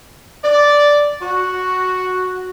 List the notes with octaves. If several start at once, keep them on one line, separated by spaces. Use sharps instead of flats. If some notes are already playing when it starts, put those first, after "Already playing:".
D5
F#4